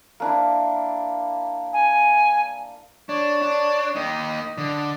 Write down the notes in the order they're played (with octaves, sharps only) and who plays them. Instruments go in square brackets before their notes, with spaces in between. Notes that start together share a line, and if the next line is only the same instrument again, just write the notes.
[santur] A#3 D4 E4
[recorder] G#5
[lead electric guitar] D4 [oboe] C#5
[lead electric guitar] D4
[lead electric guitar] A#3 D#4 [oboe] D#5
[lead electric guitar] D3